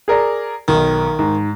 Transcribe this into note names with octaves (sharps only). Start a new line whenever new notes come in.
G#4 A#4 D5
B1 D#3
G#2